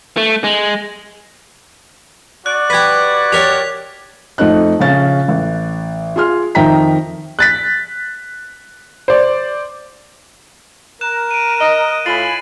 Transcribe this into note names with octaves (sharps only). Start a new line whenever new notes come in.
A3
G#3
F#4 D5 F#6
G4 B4 G#6 B6
G4 A#4 C#5 B6 F7
F2 A3 D#4 F#6
A#1 C#3 C#4 A6
A1
F4 G#4 C6 F6
F2 D#3 E5 G5 A#5 B6
F#6 A6 B6
C5 D5
A#4 F#6 E7
D7 D#7
D#5 D7
A2 F4 G#5 B5 A6 C7 F#7